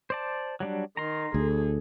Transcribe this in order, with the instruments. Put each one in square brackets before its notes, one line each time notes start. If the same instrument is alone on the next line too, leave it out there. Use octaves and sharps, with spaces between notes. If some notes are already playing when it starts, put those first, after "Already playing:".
[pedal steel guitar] C5 D5 A5
F#3 G3 D4
[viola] D#3 [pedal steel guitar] A#5 C6
[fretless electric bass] D2 [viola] G#4 A4